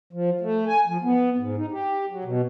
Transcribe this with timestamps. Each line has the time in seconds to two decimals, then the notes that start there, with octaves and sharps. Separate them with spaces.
0.13 F3
0.41 A3
0.67 G#5
0.87 F3
1.04 B3
1.37 G#2
1.56 D#4
1.72 G4
2.09 F#3
2.25 B2